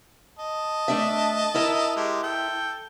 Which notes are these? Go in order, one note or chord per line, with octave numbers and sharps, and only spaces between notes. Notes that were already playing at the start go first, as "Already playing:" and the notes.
D#5 A5
A3 D4 E5
E4 A#4 E5
G#3 G4
A4 G5